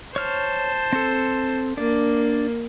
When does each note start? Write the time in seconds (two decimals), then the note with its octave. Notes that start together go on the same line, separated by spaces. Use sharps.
0.16 C5 C#5 A5 F6
0.93 C4 A4
1.77 A#3 D4 D5